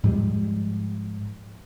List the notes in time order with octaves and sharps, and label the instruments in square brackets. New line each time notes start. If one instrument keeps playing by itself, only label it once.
[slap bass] G#2 F3 G3 G#3